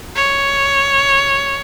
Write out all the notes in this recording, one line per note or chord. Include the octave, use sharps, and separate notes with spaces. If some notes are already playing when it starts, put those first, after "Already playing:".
C#5